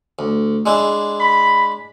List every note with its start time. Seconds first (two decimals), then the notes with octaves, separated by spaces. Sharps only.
0.19 D2
0.66 G#3 D4 E4
1.20 B5